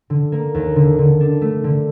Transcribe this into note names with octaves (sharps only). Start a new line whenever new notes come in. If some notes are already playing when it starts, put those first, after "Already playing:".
D3
A#3
D#2
D3
D3
D4
A3
D3